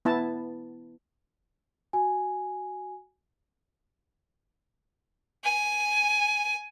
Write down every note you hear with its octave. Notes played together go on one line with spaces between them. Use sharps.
B3 E4 A5
F#4 G#5
G#5